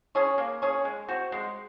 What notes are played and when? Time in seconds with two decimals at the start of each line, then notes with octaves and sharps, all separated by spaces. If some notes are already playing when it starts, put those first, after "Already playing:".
0.15 C#4 G#4 C#5
0.38 A#3
0.62 C#4 G#4 C#5
0.85 G#3
1.08 C4 F#4
1.32 G#3